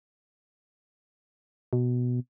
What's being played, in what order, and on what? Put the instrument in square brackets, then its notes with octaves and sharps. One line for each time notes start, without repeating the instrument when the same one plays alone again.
[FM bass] B2